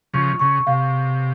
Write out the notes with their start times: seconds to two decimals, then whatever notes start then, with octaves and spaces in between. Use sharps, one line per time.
0.14 C#3 F3 C#6
0.39 C#3 C#6
0.67 C3 F5